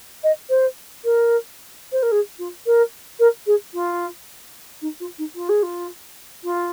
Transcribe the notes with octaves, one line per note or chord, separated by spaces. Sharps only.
D#5
C5
A#4
C5
A#4
G#4
F4
A#4
A#4
G#4
F4
D#4
F4
D#4
F4
G#4
F4
F4